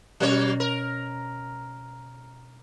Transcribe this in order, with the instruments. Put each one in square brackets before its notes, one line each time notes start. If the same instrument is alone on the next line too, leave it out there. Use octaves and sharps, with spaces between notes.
[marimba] B2 C#4 [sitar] F#3 A#3 C#5
[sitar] A#4